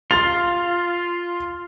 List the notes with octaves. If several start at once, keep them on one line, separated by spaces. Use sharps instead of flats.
F4 C6 A6 F7